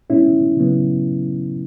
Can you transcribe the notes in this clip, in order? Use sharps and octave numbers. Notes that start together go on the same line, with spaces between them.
B2 G#3 B3 C#4 E4
C#3 F#3 B3